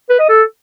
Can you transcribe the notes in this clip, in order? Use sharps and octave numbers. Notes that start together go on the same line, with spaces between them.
B4
D#5
A4